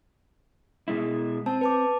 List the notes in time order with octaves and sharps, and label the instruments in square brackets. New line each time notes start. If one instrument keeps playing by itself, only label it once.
[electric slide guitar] B2 G#3 E4
[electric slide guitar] C4 [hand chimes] A5
[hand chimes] B4 A5 D6